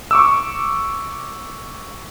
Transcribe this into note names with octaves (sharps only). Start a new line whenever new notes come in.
C#6 D6 E6